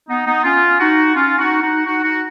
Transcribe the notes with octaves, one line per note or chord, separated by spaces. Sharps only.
B3 D#4
B3 D#4
C#4 F4
D#4 F#4
C#4 F4
D#4 F#4
D#4 F#4
D#4 F#4
D#4 F#4